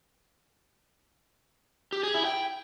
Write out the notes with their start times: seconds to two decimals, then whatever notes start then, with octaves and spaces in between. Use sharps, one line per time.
1.93 G4
2.03 G#4
2.14 E4
2.25 G5